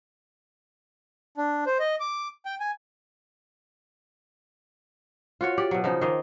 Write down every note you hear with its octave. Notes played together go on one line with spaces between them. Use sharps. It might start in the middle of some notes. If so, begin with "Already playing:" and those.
D4
C5
D#5
D6
G5
G#5
F4 F#4 C#5
G4 D5
B2 F#3
C#3 F3 D#4
D#3 A#3 C5 D#5